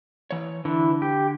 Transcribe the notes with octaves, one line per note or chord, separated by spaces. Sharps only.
E3 C#5
D3 E3
G4